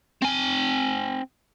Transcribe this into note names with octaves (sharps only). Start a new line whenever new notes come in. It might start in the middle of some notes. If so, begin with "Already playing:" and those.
C4 G#5